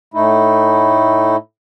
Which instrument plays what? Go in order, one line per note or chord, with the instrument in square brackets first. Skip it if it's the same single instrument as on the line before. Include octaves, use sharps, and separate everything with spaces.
[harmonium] A2 A3 D#4 E4